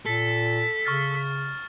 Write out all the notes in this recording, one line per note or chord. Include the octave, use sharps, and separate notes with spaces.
A#2 A4 B6
C#3 C#6 F6 A6